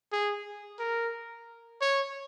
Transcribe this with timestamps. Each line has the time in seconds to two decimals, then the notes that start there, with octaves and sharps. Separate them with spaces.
0.12 G#4
0.79 A#4
1.81 C#5